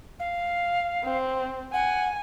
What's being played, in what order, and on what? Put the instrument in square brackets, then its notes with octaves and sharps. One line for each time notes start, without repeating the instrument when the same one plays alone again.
[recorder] F5
[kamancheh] C4
[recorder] F#5 [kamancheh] G#5